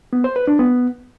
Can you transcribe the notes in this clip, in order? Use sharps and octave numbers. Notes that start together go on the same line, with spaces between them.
B3
C5
B4
D4
B3